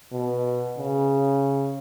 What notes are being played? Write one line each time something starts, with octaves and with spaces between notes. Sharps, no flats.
B2
C#3